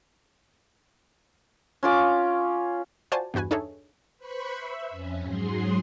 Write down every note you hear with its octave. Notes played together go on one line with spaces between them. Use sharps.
C#4 F4 D6
F4 F#4 C5 D5 G#5 A5
E2 G2 F#4 B4 G#5
D4 D#4 G#4 A4 C#5 E5
B4 C5 B5 C#6
E5
F2 C#4
G#2 F#3 G#4 C6